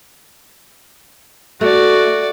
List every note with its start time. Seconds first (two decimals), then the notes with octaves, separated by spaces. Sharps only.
1.61 A3 F#4 D5